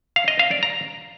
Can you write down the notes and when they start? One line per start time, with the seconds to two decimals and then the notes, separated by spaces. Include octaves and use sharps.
0.16 F5
0.28 D#5
0.39 F5
0.51 D5
0.63 A#5